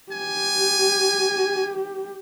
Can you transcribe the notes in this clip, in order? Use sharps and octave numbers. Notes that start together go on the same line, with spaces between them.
G4 G#5